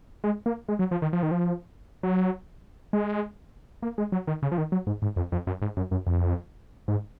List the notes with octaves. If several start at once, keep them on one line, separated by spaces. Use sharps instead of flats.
G#3
A#3
G#3
F#3
F3
D#3
F3
D#3
F3
F#3
G#3
A#3
G#3
F#3
D#3
C#3
F3
D#3
F#3
G#2
G#2
F2
F2
F#2
G#2
F#2
F#2
F2
G#2